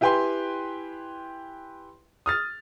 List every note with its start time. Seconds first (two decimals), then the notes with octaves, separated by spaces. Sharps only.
0.01 E4 G4 B4 G5 G#5 C6
2.26 D#6 F6 A6